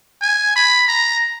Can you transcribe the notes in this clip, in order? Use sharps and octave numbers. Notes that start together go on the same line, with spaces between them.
G#5
B5
A#5